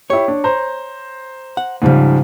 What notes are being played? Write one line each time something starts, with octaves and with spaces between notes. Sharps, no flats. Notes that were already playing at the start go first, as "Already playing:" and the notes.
E4 G4 C#5
D4
C5 A#5
F#5
D2 G#2 C#3 F3 G3